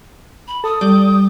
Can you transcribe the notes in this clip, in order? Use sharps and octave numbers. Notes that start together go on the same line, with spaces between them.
B5
A4 D#6
G3 G4 D5